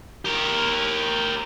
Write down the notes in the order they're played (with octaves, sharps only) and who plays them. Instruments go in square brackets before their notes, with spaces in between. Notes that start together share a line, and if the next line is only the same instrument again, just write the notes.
[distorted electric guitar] G4 A#4